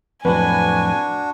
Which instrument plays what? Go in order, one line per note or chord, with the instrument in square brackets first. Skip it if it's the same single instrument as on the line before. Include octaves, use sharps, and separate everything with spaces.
[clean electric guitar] F2 A2 F#3 [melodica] D4 F#4 [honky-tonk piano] B4 [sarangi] G#5